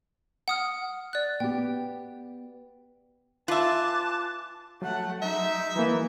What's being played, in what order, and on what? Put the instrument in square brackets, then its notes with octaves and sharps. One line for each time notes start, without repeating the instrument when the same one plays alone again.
[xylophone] F#5 D#6 F6
D5 F#6
[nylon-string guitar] B3 G4 [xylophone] G5
[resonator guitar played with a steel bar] F4 [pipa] B4 E5 [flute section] G#5 D6 F#6 [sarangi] A5
[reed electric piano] F#3 [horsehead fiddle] A3 F#5
[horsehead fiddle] G#3 D#4 [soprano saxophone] E5
[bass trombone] E3 [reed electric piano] F#3 A#3